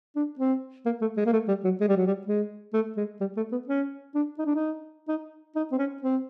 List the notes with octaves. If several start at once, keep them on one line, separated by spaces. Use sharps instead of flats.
D4
C4
A#3
A3
G#3
A#3
A3
G3
F#3
G#3
G3
F#3
G3
G#3
A3
G#3
G3
A3
B3
C#4
D4
D#4
D4
D#4
D#4
D#4
C4
C#4
C4